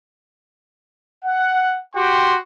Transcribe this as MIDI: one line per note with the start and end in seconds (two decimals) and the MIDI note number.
1.25 1.78 78
1.96 2.36 66
1.96 2.36 67
1.96 2.36 79
1.96 2.36 84